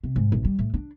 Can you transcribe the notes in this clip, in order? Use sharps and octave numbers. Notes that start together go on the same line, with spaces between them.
C3
G#2
A#1
G3
A2
D4